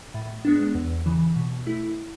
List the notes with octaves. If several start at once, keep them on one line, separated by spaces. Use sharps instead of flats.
A2
G#3 B3 D4
E2
C#3 E3
B2
A3 E4